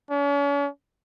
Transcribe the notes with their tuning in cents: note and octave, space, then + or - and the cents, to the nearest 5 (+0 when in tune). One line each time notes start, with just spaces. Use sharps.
C#4 +40